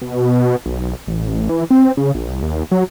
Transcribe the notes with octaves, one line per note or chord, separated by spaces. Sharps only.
B2
B1
A1
E3
C4
C#3
A#1
C2
D#2
F#3